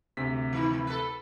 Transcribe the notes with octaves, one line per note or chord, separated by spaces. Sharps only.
D2 C3 B6
D#3
A4 B4